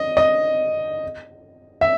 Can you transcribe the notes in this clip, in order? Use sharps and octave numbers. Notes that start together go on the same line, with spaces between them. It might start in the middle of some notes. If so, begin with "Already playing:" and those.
Already playing: D#5
D#5
E5